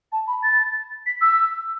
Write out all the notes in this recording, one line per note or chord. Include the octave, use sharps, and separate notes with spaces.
A5
B5
A6
B6
E6